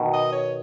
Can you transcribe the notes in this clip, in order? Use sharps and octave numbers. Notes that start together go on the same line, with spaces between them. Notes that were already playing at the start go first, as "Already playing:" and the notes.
Already playing: B2 D#3
D#5
C#5